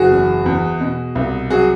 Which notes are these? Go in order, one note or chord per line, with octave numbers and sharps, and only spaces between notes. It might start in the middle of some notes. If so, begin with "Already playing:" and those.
Already playing: F#1 F#4 G#4
E2
E2
B2
C2
F#3 F#4 G#4